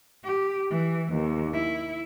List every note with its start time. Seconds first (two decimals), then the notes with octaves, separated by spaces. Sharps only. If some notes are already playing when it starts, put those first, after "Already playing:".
0.24 G4
0.71 E3
1.13 D#2
1.53 E4